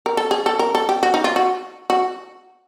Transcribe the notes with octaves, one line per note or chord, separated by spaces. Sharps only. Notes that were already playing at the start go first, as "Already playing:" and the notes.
A#4
A4
G#4
A4
A#4
A4
G4
F#4
D#4
F4
F#4
F#4